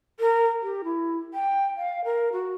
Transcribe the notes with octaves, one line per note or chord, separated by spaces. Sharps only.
A#4
G4
E4
G5
F5
A#4
F#4